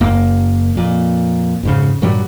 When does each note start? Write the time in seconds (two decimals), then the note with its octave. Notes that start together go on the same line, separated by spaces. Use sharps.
0.01 F#1 F#2 A#3
0.75 F2 A#2
1.63 F2 G#2 C#3
2.02 G2 A#2 F#3 G3